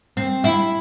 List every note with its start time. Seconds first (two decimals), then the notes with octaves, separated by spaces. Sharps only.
0.17 C4
0.44 E4